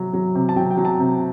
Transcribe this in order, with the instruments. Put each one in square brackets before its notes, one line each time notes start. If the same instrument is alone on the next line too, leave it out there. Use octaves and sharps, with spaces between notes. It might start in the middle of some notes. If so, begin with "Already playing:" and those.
Already playing: [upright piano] C3 F#3
F#3
C3
A5
F#3 G5
G5
F#3
A5
C3